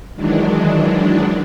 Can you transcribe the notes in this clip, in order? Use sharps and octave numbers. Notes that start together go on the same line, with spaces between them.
D#3 E3 F#3 G#3 D4